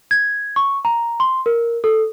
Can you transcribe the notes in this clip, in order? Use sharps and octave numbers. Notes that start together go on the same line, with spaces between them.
G#6
C#6
A#5
C6
A#4
A4